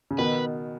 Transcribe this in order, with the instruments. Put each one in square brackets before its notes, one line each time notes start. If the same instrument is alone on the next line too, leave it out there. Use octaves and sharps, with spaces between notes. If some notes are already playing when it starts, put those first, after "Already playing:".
[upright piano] C#3
[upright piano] B2 D#3 [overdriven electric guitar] B4